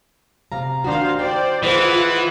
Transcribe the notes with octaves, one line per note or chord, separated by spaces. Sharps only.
C3 F5 A#5
D#3 D4 F#4 C5 F5
D#4 C5 D5 G5
E3 F4 G#4 C5 D#5 F#5